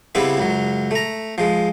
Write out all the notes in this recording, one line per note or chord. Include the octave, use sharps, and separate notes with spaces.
C#3 G3 B3 C4 E4 B4
C#2 F#2 F#3
A3 A#5
F3 G#3